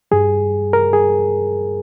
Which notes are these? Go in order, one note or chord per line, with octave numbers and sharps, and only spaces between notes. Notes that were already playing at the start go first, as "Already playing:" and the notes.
G2 G3 G#4
A#4
G#4